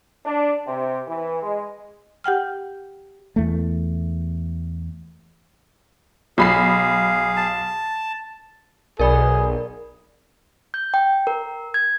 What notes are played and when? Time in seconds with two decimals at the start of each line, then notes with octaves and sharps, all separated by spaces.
0.25 D4
0.67 C3
1.08 E3
1.42 G#3
2.24 G4 F#5 G5 F6
3.36 E2 A3
6.38 B1 G#4 F5 B5 C7
7.37 A5
8.99 B1 G#4 A#4 D5 B5
10.74 G6
10.94 G5
11.27 A#4
11.74 G#6